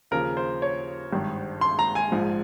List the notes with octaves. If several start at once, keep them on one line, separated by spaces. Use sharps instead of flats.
D#2 C#3 F3 A#4
C5
C#5
G#1 G2 D#3
C6
A#5
G#5
A#1 G#2 F3